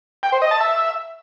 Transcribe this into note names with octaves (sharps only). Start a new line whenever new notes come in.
G5
C5
D#5
A5
E5